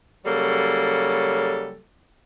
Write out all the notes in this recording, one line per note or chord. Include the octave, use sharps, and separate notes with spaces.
C#3 F#3 G3 A#3 A4